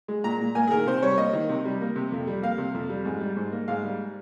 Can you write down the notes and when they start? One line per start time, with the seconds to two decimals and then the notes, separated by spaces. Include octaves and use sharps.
0.08 G#3
0.24 A#2 A#5
0.41 A#2
0.55 A#3 G#5
0.67 G#4
0.71 D#3 A#4
0.86 C3 C5
1.02 G3 C#5
1.18 A#3 D#5
1.33 D#3
1.49 C3
1.65 G3
1.81 A#3
1.96 C3
2.12 F2
2.27 G3
2.43 A#3 F5
2.58 C3
2.74 F2
2.89 G3
3.05 G#2
3.20 G3
3.36 G#2
3.52 A#3
3.68 G#2 F5
3.83 G3